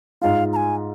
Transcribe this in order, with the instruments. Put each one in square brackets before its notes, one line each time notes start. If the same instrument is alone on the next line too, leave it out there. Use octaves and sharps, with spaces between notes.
[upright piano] G#2 G#3 F4 [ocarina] F5
[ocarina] A#5
G#5